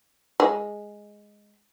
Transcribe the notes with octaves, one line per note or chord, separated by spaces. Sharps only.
G#3